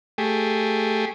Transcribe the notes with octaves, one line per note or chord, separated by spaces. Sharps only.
A3 G4 G#4